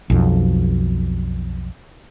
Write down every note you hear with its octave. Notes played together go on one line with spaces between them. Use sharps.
B1 F2